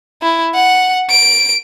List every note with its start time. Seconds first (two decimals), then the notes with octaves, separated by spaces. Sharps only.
0.22 E4
0.55 F#5
1.10 D7